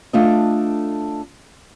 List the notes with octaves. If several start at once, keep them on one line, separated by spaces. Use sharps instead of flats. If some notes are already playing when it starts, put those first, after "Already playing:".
A3 D4 F4 A4 D#5